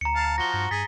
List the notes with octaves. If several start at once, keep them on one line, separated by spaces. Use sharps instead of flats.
D2 A#5 C#7
F5 A5
F3 F#4 A#6 G7
G2
G2 G#4 A6 B6